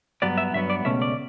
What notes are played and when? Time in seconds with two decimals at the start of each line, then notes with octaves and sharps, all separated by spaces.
0.22 G2 F#3 B3 D5
0.38 E5
0.54 G2 F#3 B3 E5
0.70 D5
0.85 C#2 B2 A3 C#4 E5
1.02 D5